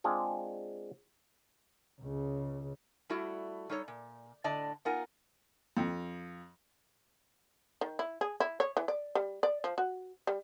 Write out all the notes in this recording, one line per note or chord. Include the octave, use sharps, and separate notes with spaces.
G#3 C4 D4 F4 G#4
C#2 C#3
G3 A3 E4 F#4
G3 D#4 A4 C#5
A#2
A2 D3 D5 D#5 A5
B3 D#4 F4 A#4 F#5 G#5
F2
D#3
E4
G#4
E4
C#5
E3
D5
G3
D5
F3
F#4
G3